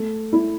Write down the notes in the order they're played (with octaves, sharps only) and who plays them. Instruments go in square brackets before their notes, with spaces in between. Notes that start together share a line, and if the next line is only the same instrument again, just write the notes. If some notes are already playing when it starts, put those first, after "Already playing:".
Already playing: [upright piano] A3
E4